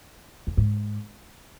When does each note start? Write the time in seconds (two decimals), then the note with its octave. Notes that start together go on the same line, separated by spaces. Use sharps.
0.47 F2
0.57 G#2